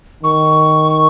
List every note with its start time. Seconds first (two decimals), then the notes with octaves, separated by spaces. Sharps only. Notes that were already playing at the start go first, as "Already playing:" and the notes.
0.23 D#3 C#6